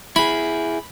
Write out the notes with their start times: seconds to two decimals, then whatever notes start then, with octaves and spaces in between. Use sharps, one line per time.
0.16 E4 G#4 B5